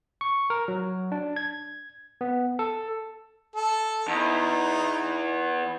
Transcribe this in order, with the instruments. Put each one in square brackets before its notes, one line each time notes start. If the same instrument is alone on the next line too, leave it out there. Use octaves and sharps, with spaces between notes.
[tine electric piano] C#6
A#4
F#3
D4
G#6
B3
A4
[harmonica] A4
[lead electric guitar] E2 [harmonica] D#4